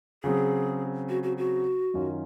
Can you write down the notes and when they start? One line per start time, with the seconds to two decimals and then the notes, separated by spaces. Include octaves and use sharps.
0.23 C#3 F#3 C4 G#4
1.09 F#4
1.23 F#4
1.38 F#4
1.94 F#2 D#3 F#3 C#4 F4